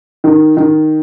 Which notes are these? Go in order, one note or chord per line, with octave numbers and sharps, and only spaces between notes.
D#3
D#3